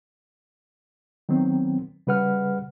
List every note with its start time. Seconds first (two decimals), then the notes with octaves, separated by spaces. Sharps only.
1.29 D#3 F#3 B3 C4
2.07 C#3 G3 B4 F#5 F6